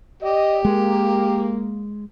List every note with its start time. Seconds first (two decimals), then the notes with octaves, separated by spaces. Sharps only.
0.23 G4 D5 D#5
0.65 G#3 A#3